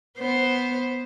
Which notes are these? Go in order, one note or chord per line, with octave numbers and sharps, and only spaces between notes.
B3 C5